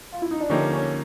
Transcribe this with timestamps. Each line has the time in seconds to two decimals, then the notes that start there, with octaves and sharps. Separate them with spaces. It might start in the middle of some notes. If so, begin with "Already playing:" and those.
0.12 F4
0.22 E4
0.31 D#4
0.41 D4
0.50 D3 F3 A#3 C#4 D#4 G4
0.73 C#4